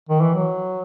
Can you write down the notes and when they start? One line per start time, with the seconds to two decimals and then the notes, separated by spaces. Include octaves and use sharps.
0.09 D#3
0.21 E3
0.35 F#3